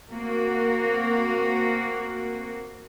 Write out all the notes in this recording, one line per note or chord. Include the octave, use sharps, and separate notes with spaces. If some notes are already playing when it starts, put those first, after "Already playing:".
A#3 C4 F#4